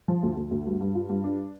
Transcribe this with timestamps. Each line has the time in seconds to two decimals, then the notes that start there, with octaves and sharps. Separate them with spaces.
0.08 F3
0.23 D2
0.36 D2
0.51 D2
0.66 G2
0.81 G2
0.95 F4
1.09 G2
1.24 D4